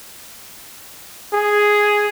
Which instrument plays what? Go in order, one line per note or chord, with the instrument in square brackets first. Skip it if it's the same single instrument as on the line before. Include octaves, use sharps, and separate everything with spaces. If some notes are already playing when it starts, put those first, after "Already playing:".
[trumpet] G#4